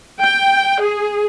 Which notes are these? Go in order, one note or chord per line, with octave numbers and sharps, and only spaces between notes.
G5
G#4